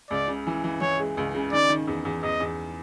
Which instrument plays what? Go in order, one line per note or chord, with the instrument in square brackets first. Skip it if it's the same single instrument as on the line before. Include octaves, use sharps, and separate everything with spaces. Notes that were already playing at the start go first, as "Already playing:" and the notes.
[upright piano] C#2 [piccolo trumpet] D5
[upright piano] C#3
E3
E3
[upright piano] E3 [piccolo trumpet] C#5
[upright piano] G#3
C#2
C#3
[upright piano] D#3 [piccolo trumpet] D5
[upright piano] D#3
E2
E2
[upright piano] E2 [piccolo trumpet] D#5
[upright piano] E2